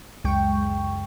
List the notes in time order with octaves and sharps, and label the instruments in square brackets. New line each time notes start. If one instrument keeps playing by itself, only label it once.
[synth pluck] C#2 F#2 G#3 G5 C#6